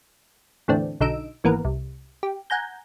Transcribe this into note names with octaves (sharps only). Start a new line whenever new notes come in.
E2 A2 D3 C4 D4
B1 D3 D#4 E6 D7
G#1 E3 A#3 B3 A#4
C2
G4
F#5 G#5 A#5 G6